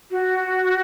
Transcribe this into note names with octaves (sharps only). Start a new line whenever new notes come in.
F#4